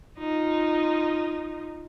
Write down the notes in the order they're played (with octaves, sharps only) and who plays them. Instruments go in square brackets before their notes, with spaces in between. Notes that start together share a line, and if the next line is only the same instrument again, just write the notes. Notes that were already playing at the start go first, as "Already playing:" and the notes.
[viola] D#4 F4